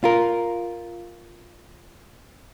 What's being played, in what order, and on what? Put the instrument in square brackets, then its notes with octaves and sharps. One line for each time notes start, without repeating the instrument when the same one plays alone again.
[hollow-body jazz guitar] F4 A#4